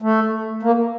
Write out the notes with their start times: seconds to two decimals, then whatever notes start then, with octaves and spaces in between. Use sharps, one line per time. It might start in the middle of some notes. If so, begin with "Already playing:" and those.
0.02 A3
0.63 A#3